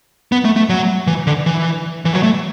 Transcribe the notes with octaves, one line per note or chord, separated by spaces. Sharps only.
B3
A3
A3
F#3
E3
D3
E3
E3
F#3
A3